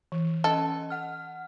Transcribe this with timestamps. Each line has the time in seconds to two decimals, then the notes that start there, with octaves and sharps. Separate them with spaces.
0.12 E3
0.44 C#4 A4 D#5
0.90 F#5 F6